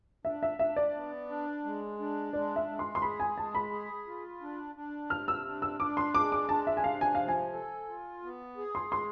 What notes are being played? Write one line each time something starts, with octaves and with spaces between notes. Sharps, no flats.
D4 E5
E5
D4 E5
D5
B3
D4
G#3
D4
G#3 D5
E5
G#3
C6
C6
G#4 B5
G#5
G#3 A5
B5
G#4
F4
D4
D4
C3 F6
E6
D4
E6
D4 D6
C6
G#3 D6
D6
D4 A5
E5
G#5
C3 F5
G#5
F3 F5
G#5
A4
F4
B3
G#4
C6
G#3 C6